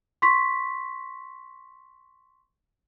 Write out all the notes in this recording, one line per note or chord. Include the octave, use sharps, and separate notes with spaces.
C6 C#6 B6